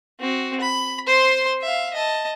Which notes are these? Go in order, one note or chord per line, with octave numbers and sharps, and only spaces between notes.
C4 F#4
B5
C5 C6
E5 F5
D#5 A5